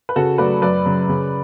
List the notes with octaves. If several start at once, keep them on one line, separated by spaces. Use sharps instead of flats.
B4
C#3 F#4 A4
F#3 A3 B4 D5
F#2 B4 D5
C#3 F#3
C#3